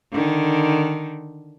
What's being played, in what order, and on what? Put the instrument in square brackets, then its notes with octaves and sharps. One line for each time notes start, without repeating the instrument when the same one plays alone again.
[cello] D3 D#3